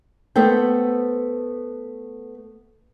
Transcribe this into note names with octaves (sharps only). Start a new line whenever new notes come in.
A3 B3 A4 C5 G5